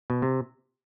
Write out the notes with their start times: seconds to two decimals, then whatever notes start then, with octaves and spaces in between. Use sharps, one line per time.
0.10 B2
0.22 C3